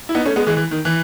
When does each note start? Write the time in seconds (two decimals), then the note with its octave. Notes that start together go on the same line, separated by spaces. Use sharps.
0.09 E4
0.15 B3 D#4
0.25 A3 C#4
0.36 G#3 B3
0.46 E3 G#3
0.57 E3
0.71 D#3
0.85 E3